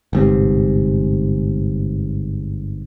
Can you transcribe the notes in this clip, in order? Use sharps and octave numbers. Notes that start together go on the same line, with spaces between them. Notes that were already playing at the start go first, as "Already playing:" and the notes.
G1 G#2 C3